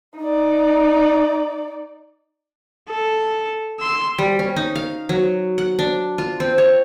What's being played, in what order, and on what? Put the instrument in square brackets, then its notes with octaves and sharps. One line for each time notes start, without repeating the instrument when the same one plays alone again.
[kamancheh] D#4 D5
[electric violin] A4
C6 E6
[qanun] G3
C#4
D#4
F5
F#3
F#5
D4
F4
C4
C#5